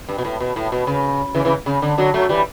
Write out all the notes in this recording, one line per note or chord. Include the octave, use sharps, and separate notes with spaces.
G2
B2
A2
B2
A2
B2
C#3
C#3 E3
C#3 E3
C#3
D3
D3 F#3
F#3 A3
E3 G3